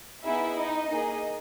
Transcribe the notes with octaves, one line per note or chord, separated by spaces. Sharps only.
B3 D#4 E4 G#4 E5
D#4 D#5
A#3 D#4 G#4